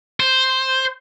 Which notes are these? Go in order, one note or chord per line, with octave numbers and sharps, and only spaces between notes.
C5